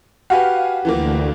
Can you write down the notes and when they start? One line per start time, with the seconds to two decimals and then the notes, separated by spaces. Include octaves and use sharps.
0.30 F#4 G4 B4 F5 F#5 G#5
0.85 D2 E3 F3 A#3